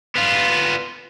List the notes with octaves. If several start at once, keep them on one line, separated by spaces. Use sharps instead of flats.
B3 F4